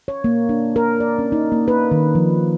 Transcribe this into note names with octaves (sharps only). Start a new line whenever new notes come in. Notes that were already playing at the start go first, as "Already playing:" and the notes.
C#5
A#3
D4
A#4
D5
C#4
D#4
A#3
B4
D#3
F3